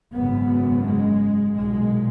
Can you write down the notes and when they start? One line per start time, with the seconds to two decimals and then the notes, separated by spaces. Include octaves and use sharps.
0.14 G#1 F#2 C#3 B3
0.85 G#3
1.56 B1 A#2 G#3